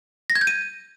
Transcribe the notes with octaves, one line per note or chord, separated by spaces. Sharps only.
A#6
G#6
G6
D#7